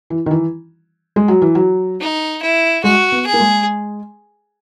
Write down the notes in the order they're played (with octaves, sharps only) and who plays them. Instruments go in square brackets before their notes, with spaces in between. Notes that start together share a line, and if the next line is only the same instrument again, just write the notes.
[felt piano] E3
D#3
E3
G#3
F#3
E3
F#3
[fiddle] D#4
E4
[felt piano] G#3 [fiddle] F#4
[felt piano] B3
[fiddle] G#4
[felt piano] A#3
G#3